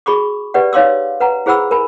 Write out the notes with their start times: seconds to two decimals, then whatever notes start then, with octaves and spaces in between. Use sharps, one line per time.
0.06 F#4 G#4 B5 C#6 D6
0.54 G4 B4 D5 F#5
0.73 D#4 C#5 F5 C6 D6 E6
1.20 B4 F#5 A#5
1.46 E4 G#4 C5 F#5 B5 E6
1.71 A#4 G#5 B5